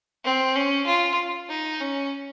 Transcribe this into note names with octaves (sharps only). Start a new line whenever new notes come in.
C4
C#4
F4
D#4
C#4